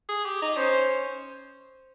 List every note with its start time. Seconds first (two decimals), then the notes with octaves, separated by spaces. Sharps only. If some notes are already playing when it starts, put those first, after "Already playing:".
0.09 G#4
0.26 G4
0.42 D#4
0.57 C#4 C5